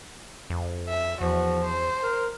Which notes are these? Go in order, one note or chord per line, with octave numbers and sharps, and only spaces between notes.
F2
E5
E2 F3 F#4
C5
A#4